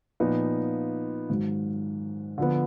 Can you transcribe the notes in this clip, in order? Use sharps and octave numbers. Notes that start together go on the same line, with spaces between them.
A#2 F3 B3 D#4
G#2 D#3 F#3
D3 F3 B3